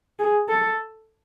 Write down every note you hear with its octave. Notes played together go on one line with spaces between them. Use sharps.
G#4
A4